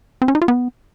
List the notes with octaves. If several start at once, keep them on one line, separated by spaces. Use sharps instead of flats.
C4
C#4
D#4
F4
B3